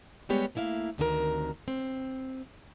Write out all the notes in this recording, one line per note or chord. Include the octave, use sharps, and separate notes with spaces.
G3 G#3 B3 G4 C#5
A3 A#3 E4 E5 F5
D2 C3 D#3 F#4 G4 A#4
C4